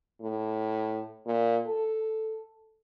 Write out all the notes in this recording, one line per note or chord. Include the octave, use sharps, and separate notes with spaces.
A2
A#2
A4